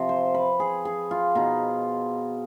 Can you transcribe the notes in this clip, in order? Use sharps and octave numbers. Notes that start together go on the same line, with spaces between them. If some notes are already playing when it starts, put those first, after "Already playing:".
Already playing: C3 F3
C5
B4
G#4
G#4
F4
B2 D#4